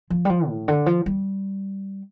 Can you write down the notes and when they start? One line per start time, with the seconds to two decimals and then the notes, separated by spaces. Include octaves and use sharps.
0.10 F3
0.25 G3
0.30 F3
0.48 A2
0.68 D3
0.86 F3
1.06 G3